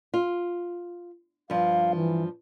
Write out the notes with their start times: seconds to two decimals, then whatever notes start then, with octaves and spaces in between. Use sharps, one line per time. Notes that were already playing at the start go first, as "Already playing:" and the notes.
0.14 F4
1.50 G2 F3 F5
1.96 E3